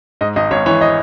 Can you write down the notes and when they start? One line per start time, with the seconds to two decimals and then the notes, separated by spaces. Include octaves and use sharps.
0.21 G#2 D#5
0.36 G#1 D#5
0.51 G#1 C#5
0.66 E3 C#5
0.81 D#5